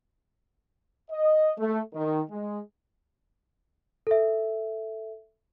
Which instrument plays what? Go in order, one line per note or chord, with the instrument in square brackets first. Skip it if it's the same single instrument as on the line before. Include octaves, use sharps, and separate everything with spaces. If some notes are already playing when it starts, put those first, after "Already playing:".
[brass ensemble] D#5
A3
D#3
G#3
[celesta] A4 E5